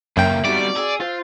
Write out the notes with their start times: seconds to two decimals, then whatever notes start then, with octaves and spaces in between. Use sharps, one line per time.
0.17 C#2 F#2 A#3 E5 G5
0.44 G3 B3 C4 D#4 F#4 D5
0.76 G#4 E6
1.00 F4 C5 F5 A6